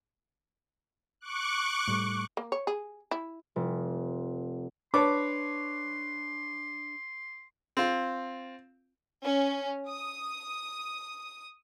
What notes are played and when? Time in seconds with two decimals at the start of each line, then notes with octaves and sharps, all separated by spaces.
1.21 C#6 D6 F#6
1.88 A2 G3 A3
2.37 A#3
2.52 C#5
2.67 G#4
3.11 E4
3.56 F1
4.94 D4 B4 C#5 A5 C6 D6
7.77 C4 F4
9.21 C#4
9.87 D#6